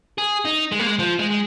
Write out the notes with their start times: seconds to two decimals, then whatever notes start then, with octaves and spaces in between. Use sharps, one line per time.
0.18 G#4
0.45 D#4
0.72 G#3
0.79 A#3
0.86 G#3
0.99 F3
1.19 G#3
1.30 G#3